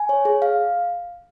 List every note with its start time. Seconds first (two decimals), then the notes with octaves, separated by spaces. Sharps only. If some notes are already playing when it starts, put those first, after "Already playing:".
Already playing: G#5
0.09 C#5
0.25 G#4
0.42 F5